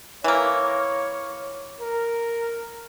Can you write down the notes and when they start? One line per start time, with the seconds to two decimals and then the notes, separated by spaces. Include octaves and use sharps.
0.24 E3 A#3 C#5
1.80 A#4